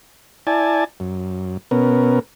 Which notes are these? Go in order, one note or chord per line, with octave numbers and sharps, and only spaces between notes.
E4 D5 G#5 A5
F#2
B2 B3 C#4 A#4